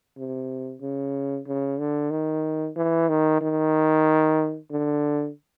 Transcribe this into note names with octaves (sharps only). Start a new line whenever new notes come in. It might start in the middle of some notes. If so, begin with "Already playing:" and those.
C3
C#3
C#3
D3
D#3
E3
D#3
D#3
D3